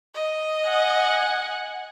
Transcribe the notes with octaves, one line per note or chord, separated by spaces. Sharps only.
D#5
F#5 G#5